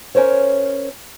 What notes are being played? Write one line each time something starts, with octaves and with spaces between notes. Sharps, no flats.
C#4 A#4 C5 C#5